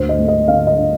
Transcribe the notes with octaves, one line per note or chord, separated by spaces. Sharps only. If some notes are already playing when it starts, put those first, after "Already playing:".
Already playing: D2 A#3 C5
D#5
A3
D#5
D3 F5
D#5
D4